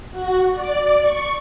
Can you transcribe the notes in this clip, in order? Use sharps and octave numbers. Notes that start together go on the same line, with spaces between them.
F#4
D5
C#6